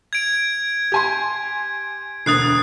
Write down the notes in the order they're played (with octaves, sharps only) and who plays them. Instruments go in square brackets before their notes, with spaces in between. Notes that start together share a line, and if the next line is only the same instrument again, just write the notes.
[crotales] G#6 D7
[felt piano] G4 G#5 C6
[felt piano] E1 D2 A6 [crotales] D#6 F#6 C7